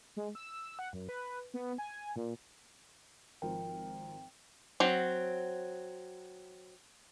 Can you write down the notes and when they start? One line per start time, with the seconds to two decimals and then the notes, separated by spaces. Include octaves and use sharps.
0.17 G#3
0.35 E6
0.79 F#5
0.93 F#2
1.09 B4
1.54 B3
1.78 G#5
2.16 A#2
3.42 G#1 F3 A#4 G5
4.80 F#3 C4